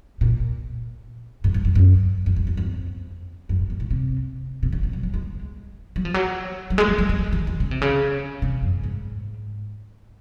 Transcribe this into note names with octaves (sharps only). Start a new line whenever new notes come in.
A#2
G#2
G#2
F#2
F#2
F2
F#2
F#2
F2
F#2
G#2
G#2
A#2
C3
C3
C#3
C#3
F#3
F#3
G#3
F#3
F3
F#3
F#3
G#3
F3
F#3
G#3
F#3
D#3
D#3
C#3
C3
C#3
C3
F#2
G#2